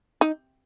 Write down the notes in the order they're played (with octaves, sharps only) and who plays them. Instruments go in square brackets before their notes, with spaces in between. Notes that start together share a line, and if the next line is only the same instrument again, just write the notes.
[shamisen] D#4